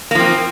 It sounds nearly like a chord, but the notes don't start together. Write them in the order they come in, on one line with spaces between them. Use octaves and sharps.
A#3 F3 C4